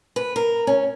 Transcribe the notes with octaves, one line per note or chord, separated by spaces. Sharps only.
B4
A#4
C#4